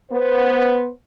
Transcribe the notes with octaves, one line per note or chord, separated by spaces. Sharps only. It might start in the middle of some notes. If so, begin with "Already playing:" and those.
B3 C5